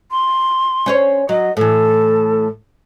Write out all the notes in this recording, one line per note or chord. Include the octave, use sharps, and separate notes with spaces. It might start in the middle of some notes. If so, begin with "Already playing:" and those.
C6
C#4 C5 C#5
F#3 D#5
A2 E3 A4